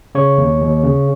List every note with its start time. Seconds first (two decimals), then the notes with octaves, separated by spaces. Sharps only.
0.15 C#3 C#5 C#6
0.38 D#2
0.60 D#2
0.83 C#3